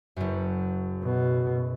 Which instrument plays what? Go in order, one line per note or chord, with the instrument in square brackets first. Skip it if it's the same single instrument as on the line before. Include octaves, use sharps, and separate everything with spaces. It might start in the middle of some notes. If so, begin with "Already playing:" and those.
[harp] F#1 F#2
[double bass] B2